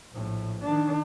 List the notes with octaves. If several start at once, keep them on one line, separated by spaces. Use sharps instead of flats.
A#1 A2
D#3 D4